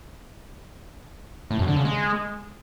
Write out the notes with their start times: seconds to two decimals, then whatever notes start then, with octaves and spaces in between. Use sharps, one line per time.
1.51 A2
1.59 F#2
1.68 D3
1.77 C#3
1.85 G#3